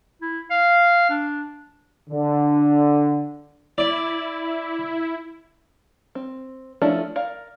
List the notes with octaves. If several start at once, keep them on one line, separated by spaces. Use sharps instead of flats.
E4
F5
D4
D3
E4 D5
C4
F3 A3 C#4 D4 E4
A#4 D5 F5